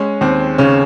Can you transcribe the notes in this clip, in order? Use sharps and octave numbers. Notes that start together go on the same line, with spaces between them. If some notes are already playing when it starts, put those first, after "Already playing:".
Already playing: G#3 C#4
D#2 C4
C#3 C#4